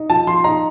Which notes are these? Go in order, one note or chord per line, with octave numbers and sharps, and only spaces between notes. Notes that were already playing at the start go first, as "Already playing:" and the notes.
Already playing: D#4
F3 A5
F3 C6
D#4 A#5